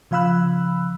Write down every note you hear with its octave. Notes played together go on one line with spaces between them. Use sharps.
C#3 F3 F5 B5 E6 F#6